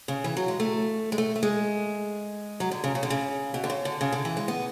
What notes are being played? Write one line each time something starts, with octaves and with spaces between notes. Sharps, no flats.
C#3
E3
F#3
G#3
A3
G#3
A3
A3
G#3
F#3
D3
C#3
C#3
D3
C#3
B2
D3
C#3
D3
C#3
D3
E3
G#3
B3